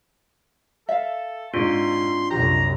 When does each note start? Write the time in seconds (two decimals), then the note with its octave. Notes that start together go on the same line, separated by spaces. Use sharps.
0.89 A4 E5 F5
1.54 G#2 C4 D4 F4 C6
2.31 C2 F#2 G4 A#5